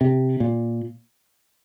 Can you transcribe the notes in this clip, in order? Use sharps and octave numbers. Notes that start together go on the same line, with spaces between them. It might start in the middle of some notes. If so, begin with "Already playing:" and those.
C3
A#2